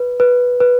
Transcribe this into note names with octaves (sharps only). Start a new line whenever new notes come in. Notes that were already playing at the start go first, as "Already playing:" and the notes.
Already playing: B4
B4
B4